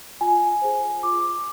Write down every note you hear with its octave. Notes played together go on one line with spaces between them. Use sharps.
F4 G#5
G#4 C5
F4 D6